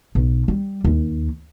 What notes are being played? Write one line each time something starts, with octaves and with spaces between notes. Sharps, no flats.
B1
G3
D#2